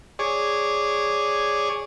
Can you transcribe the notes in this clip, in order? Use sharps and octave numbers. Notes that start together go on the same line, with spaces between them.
G#4 C#5 D5